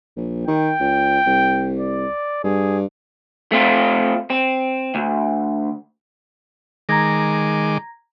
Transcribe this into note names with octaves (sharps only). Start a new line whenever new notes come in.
A#1
D#3 G5
C#2
C2
D5
G2 G#4
A3 C4 F4
C4
D2
D#3 G#3 A#5 D6 G#6 A#6